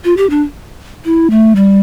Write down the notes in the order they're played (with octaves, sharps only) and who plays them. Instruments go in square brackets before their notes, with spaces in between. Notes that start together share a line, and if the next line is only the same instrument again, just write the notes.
[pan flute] F4
G4
D4
E4
A3
G3